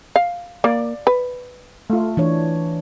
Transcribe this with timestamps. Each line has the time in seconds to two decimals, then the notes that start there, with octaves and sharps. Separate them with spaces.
0.16 F5
0.64 A#3 D5
1.07 B4
1.90 A3 F4
2.17 E3 D4 C#5